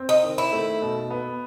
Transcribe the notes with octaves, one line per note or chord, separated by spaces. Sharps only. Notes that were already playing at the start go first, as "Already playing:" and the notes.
Already playing: C4
D#4
D#3
E4
A3
B2
B3